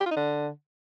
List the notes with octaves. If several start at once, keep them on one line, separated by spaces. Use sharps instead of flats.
G4
F4
D#4
D3